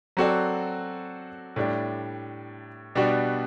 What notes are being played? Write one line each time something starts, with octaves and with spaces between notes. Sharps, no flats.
F#3 C4 F#4 A4 D5
A2 G3 D4
B2 G3 B3 D4 F#4